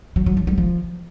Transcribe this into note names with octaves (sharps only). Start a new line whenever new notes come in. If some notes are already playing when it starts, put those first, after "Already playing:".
F#3
F#3
E3
G3
F3